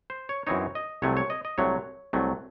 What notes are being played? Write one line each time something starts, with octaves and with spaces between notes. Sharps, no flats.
C5
C#5
F#2 E3 C4 D#4 C#5
D#5
C2 C3 F#3 A3 C#5
C#5
D#5
D#5
C2 C3 F#3 A3 C#5
C2 C3 F#3 A3